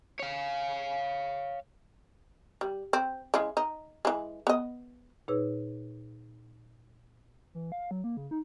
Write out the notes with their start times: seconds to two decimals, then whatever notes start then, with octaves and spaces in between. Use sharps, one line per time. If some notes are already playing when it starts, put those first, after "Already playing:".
0.19 C#5 F5
2.61 G3
2.93 C4
3.34 C#3 E3 G#3
3.57 D#4
4.05 E3 G#3
4.47 B3 D#5
5.28 A#2 D#4 G#4 B4 C#5 E6
7.54 E3
7.72 F5
7.91 F#3
8.04 A#3
8.17 C#3
8.31 D#4